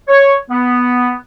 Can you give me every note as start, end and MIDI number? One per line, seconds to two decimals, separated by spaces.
0.08 0.34 73
0.49 1.13 59